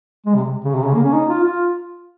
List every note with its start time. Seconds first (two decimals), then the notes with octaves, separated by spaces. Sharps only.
0.26 G#3
0.35 C3
0.64 C#3
0.75 C3
0.84 C#3
0.94 A#3
1.04 C#4
1.13 D#4
1.29 F4
1.43 F4